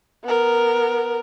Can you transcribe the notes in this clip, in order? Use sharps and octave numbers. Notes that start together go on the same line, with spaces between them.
B3 A#4